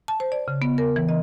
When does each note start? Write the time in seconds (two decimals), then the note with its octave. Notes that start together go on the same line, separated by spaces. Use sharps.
0.08 A5
0.20 C5
0.32 D5
0.48 C#3
0.62 B3
0.78 A#4
0.96 E3
1.09 D#5